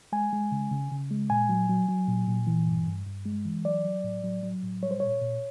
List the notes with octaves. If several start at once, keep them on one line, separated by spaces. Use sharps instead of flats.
G#3 G#5
G#3
C#3
C#3
C#3
G#3
A#2 G#5
F#3
F#3
F#3
A#2
A#2
E3
G2
G2
G2
G#3
E3
F#3 D5
F#3
A2
F#3
F#3
A2
G3 C#5
C5
A#2 C#5
A#2